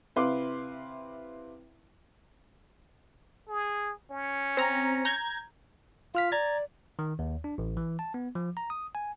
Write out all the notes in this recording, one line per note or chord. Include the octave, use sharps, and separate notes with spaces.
C3 E4 B4 F5 C6 D6
G#4
C#4
C4 A#5
A#5 G6 G#6
F4 F5 F6 B6
D5 A#5 G#6 A6
D#3
D#2
D4
A1
E3
A5
B3
F3
A#5
D#6
G#5